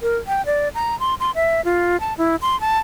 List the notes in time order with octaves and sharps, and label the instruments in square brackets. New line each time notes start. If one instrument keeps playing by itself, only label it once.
[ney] A#4
G5
D5
A#5
C6
C6
E5
F4
A5
E4
C6
A5